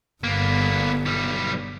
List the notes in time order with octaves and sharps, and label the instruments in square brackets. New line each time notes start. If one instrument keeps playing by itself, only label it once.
[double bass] G1 G2 [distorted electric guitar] A#3 B3
[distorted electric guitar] B1 G3